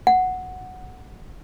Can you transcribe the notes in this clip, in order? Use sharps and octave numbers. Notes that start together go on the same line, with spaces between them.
F#5